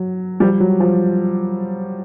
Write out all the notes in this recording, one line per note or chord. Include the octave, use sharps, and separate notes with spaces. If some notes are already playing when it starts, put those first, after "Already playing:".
Already playing: F#3
F3 G3
F#3
F3